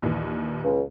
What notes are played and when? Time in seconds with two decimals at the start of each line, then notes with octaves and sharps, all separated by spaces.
0.02 A#1 D#2 E3
0.64 C#2